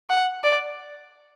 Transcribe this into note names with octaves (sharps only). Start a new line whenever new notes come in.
F#5
D5